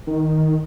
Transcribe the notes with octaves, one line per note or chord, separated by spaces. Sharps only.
D#3